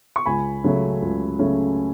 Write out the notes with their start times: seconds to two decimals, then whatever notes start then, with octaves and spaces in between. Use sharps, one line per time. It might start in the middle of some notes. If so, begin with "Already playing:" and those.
0.16 C#6
0.26 C#2 G#5 B5
0.64 C#3 F#3 A3 C#4
1.02 C#2
1.39 C#3 F#3 A3 C#4